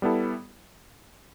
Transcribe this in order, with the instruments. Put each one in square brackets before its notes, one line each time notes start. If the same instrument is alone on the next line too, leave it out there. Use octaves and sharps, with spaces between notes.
[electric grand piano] G3 B3 E4 A4